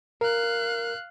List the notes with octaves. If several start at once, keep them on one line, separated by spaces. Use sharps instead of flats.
A#4 F5 F#6